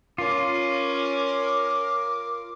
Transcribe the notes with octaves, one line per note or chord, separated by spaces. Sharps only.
C#4 F4 A#4 D6